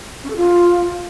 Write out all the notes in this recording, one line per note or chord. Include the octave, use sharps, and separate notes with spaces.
C#4
A4
F4